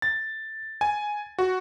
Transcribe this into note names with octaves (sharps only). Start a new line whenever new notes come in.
A6
G#5
F#4